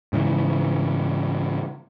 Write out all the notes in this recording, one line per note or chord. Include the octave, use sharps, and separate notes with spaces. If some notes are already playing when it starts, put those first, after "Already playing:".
G#2 C#3 E3